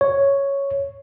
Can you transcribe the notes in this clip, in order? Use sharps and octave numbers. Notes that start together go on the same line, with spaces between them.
C#5